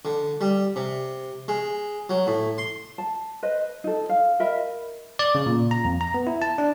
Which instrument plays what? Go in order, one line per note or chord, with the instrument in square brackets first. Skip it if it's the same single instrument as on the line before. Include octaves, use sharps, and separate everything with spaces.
[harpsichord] D3
G3
C3
G#3
F#3
A2
C6
[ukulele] A5
B4 C5 D#5
D#4 A4
F5
A#4 D#5 E5 B5
[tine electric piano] D5
C#3
A#2
A#5
F2
A#5
B3
E4
A5
D4